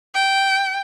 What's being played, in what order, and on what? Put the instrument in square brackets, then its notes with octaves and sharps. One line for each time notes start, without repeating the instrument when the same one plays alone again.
[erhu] G5